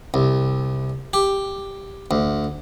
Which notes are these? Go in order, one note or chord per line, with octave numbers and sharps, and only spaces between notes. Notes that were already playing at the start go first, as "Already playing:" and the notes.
C2
G4
D2